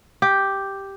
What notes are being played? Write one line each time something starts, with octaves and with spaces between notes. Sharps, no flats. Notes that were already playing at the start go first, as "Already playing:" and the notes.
G4